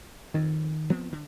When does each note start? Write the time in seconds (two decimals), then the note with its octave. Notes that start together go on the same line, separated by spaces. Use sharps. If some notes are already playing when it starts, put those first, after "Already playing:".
0.34 F2 D#3
0.90 F3 B3 C4
1.12 D3